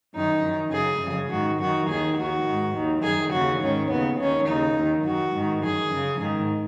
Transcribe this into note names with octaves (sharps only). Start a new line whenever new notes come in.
F#2 D#3 D#4
F#2 D#3
F#2 C#3 G#4
F#2 C#3
G#2 D#3 F#4
F#2 D#3 F#4
D#2 D#3 G#4
D#2 D#3 F#4
G#2 D#3
D#2 D#3
F#2 D#3 G#4
D#2 C#3 F#4
G#2 D#3 C#4
D#2 C#3 B3
D#2 D#3 C#4
D#2 C#3 D#4
D#2 D#3
F#2 D#3 F#4
G#2 D#3
F#2 D#3 G#4
F#2 C#3
G#2 D#3